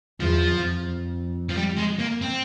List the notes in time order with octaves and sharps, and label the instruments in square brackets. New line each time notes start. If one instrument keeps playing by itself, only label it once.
[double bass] E2 [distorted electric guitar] F3
[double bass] F2
[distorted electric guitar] F3
G3
G#3
A#3
C4